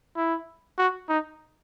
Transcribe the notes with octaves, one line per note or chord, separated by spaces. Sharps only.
E4
F#4
D#4